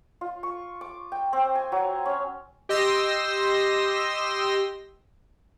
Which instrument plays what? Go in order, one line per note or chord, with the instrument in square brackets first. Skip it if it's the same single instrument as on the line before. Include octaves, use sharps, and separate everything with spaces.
[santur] F4
C#6
D6
G5
C4
G#5
F#3
C#4
[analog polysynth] G4 D#5 C6 E6 A#6